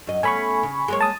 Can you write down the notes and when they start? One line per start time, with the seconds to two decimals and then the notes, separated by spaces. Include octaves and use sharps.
0.07 F#2 D#5
0.23 A3 B3 C#4 G#5 B5 C#6
0.63 C#3
0.88 G#3 A#3 C#5
1.01 A5 D#6